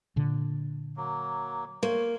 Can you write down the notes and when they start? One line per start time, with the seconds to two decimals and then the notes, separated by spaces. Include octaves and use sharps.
0.16 A#2 D3
0.97 F#3 A#3
1.83 A#3 C5 C#5